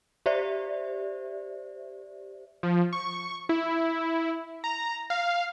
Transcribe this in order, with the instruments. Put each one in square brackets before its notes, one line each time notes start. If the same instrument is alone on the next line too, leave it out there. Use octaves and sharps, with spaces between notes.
[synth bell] G4 C5 D5 E5
[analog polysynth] F3
C#6
E4
A#5
F5